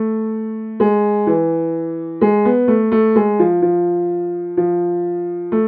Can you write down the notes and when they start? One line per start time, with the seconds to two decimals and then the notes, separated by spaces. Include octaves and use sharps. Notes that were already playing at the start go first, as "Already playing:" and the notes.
Already playing: A3
0.80 G#3
1.27 E3
2.21 G#3
2.45 B3
2.68 A3
2.92 A3
3.16 G#3
3.39 F3
3.62 F3
4.57 F3
5.52 A3